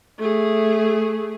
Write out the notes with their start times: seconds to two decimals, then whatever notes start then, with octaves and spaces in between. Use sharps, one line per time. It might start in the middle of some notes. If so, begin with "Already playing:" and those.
0.18 A3 G#4